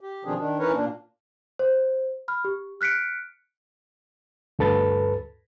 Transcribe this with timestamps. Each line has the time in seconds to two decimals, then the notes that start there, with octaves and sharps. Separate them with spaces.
0.01 G4
0.25 B2 D#3 F3 C4 D4 G#4
0.37 D#3 D4
0.59 E3 C#4 D#4 A#4 B4 C#5
0.72 A#2 A#3 D4
1.59 C5
2.28 B5 F6
2.45 G4
2.81 F6 F#6 B6 C#7 D7
4.59 D2 G2 A4 B4 A6